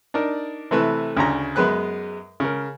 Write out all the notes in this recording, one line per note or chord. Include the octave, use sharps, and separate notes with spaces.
D4 D#4 A#4 D5
C3 E3 A3 B4
D2 C#3 A#5
F#2 G#3 B3 B4 F#6
C#3 A#4